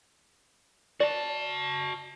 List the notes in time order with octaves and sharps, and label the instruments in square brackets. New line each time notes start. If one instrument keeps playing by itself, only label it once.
[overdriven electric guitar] F#4 A5 [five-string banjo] D5